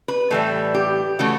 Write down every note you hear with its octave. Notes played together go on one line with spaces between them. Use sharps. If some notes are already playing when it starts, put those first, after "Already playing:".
B4
A2 E3 G3 A4
G4
C#3 E3 A3 F#4